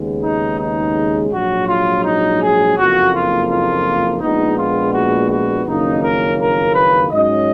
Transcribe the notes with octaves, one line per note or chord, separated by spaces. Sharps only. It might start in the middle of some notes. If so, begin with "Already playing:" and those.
Already playing: D#2 C#3 G#3 B3
D#4
D#4
A#1 G#2 F#3 F#4
F4
D#4
G#4
F#1 F2 F3 A#3 F#4
F4
F4
A#1 A#2 G#3 B3 D#4
F4
F#4
F#4
F#1 F2 D#3 A#3 C#4 D#4
A#4
A#4
B4
G#2 F#3 C#4 D#5